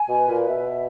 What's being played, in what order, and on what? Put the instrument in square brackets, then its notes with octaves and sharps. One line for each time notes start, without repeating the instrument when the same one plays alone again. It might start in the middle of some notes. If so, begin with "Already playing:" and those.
Already playing: [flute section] G#5
[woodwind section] B2
[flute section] B4
[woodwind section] A#2
[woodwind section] B2 [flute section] E5